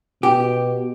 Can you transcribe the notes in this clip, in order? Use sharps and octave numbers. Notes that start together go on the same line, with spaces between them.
B2 G4